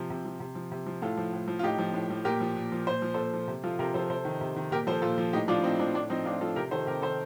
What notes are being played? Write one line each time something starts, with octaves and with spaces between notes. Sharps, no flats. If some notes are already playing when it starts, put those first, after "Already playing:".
Already playing: C3 F3
C3
F3
C3
F3
C3
F3
A2 F4 A4
F3
A2
F3
F4
A2 D#4 G4
F3
A2
F3
A#2 G4 A#4
F3
A#2
F3
A#2 C5
F3
A#2 A4 C5
F3
C3
F3 F4 A4
C3 G4 A#4
F3 A4 C5
C3 A4 C5
D#3
C3
D#3
A#2 G4 A#4
F3 A4 C5
A#2 F4 A4
F3
A2 D#4 G4
F3 D4 F4
A2 C4 D#4
F3 D4
A2 D4
F3 C4 D#4
A2 D4 F4
F3 F4 A4
C3 G4 A#4
D#3 A4 C5
C3 G4 A#4
D#3 A4 C5